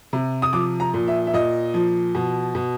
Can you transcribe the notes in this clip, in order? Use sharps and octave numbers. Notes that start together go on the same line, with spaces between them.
C3
D#6
F3 D6
A#5
A#2
E5
E5
A#2 D#5
F3
B2
B2